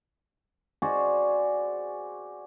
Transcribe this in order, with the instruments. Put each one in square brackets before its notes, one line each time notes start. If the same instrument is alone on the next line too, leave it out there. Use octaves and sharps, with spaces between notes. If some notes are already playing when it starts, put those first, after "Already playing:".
[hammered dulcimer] F#4 G#4 C5 D5